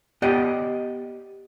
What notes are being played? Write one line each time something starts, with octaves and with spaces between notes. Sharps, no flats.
B3 G4 D5 D#5 F#5 G5